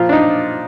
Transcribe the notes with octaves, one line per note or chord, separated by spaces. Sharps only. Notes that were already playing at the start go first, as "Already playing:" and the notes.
Already playing: A#2 F3 F4
D4
D#4